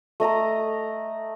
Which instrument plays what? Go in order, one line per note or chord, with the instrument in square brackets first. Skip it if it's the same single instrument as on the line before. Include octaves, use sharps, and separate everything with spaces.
[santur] A3 D#5 A#5 D#6